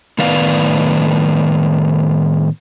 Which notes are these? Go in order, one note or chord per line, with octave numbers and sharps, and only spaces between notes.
A2 D#3 B3 B4 D5 F5